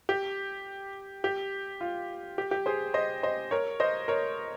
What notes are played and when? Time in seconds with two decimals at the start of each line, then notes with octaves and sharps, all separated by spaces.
0.09 G4
1.24 G4
1.81 F4
2.38 G4
2.51 G4
2.66 G#4 C5
2.94 C5 D#5
3.23 C5 D#5
3.51 A#4 C#5
3.80 C5 D#5
4.08 A#4 C#5